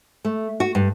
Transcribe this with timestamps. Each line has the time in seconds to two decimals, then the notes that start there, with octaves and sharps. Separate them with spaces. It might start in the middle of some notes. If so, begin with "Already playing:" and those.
0.25 A3
0.60 F#4
0.75 G2